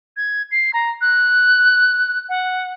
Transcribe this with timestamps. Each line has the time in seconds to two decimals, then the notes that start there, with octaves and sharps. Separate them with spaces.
0.17 G#6
0.51 C7
0.73 A#5
1.01 F#6
2.29 F#5